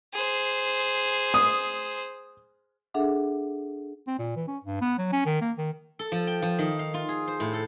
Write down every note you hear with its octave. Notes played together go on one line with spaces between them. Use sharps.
G#4 C5
D#6
D4 G#4 A4 E5 F#5 D6
C4
A#2
E3
C#4
G2
B3
F#3
C#4
D#3
A#3
D#3
A4
F3
G5
F3
D#3
F5
F4
G#4
C5
A2
A4